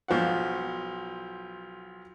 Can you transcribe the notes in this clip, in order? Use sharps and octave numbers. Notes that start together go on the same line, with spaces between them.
B1 F3 F5 F#5